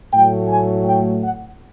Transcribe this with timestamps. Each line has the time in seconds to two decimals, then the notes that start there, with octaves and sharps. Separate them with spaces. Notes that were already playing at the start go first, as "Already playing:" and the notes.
0.12 A2 F#3 A3 G5
0.49 G#5
0.85 G5
1.22 F#5